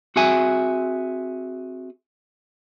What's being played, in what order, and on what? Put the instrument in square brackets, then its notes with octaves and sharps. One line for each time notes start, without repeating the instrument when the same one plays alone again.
[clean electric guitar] C4 F#4 G#4 E5 G#5